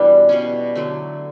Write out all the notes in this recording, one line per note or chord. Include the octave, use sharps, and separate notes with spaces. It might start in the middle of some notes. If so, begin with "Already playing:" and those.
Already playing: B2 E3 G3 D4
B2 G3 C#4
D3 F#3 A3